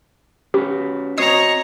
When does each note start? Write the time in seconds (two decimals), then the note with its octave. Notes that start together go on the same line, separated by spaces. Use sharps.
0.54 C#4 F#4 G4 B4
1.18 C4 F#4 C#5 D#5 A#5 D#6 G#6 C7